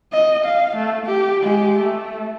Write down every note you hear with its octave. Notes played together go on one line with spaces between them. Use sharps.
D#5
F5
A3
G4
G#3 G4
A3